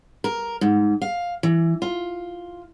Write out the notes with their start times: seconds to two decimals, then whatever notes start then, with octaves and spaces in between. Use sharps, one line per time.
0.24 A#4
0.61 G#2
1.02 F5
1.43 E3
1.82 F4